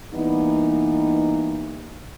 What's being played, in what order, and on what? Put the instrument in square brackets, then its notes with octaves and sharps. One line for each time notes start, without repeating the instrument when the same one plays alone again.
[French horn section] E3 G3 A#3 B3 D#4